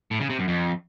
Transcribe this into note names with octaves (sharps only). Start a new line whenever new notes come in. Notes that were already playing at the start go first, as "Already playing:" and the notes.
A2
C#3
C3
F#2
F2